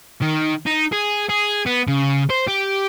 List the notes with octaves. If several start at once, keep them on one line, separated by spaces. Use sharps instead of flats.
D#3
D#4
G#4
G#4
B3
C#3
C5
G4